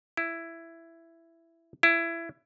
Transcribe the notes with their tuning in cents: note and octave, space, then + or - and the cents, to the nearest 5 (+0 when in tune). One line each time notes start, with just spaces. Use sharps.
E4 +10
E4 +20